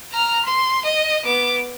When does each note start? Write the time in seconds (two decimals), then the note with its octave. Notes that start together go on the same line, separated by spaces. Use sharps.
0.12 A#5 F6
0.45 C6
0.85 D#5
1.26 B3 D6